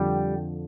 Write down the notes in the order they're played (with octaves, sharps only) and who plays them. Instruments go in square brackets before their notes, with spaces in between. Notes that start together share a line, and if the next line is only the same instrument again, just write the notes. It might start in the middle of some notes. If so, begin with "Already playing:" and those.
Already playing: [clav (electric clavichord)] F2 D3 F3 [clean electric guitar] G3